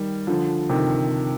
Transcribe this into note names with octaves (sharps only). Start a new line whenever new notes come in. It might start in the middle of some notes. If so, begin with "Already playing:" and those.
Already playing: D#3 G3
D3 F3
C3 D#3